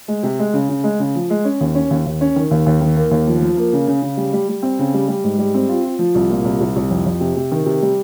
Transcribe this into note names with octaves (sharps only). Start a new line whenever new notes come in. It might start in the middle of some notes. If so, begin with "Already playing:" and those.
G#3
C3
G#3
C#3
C#3
G#3
C#3
F3
G#3
C#4
D#2
C#4
D#2
D#2
C#4
D#3
D#2
D#2
D#3
A#3
D#2
F3
F3
A#3
C#3
C#3
C#3
G3
G3
G3
C4
C#3
G3
G3
G#2
G3
C4
F4
F4
F3
C2
A#2
C2
C2
C2
F2
F2
C3
C3
D#3
C3
G3